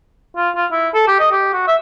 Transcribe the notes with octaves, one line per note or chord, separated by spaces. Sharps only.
F4
F4
E4
A4
G4
D#5
G4
F#4
E5